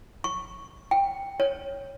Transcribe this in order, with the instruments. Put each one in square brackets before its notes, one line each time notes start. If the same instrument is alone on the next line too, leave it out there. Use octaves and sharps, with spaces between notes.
[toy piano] C#6
G5
C#5